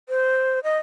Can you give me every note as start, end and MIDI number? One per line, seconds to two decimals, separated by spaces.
0.09 0.60 72
0.64 0.78 75